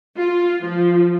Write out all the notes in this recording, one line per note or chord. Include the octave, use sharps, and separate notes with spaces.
F4
F3